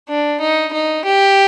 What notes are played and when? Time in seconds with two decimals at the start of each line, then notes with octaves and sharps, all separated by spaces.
0.09 D4
0.41 D#4
0.73 D#4
1.05 G4